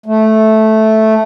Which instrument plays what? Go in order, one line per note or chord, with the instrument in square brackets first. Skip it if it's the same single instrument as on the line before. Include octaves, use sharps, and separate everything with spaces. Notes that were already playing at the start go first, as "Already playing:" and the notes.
[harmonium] A3